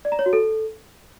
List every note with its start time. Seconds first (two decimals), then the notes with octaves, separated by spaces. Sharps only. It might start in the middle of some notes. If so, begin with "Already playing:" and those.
0.05 D5
0.12 A#5
0.19 C#5
0.26 F#4
0.33 A4